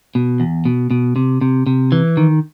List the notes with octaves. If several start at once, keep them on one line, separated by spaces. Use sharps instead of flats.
B2
E2
B2
B2
C3
C3
C3
E3
D#3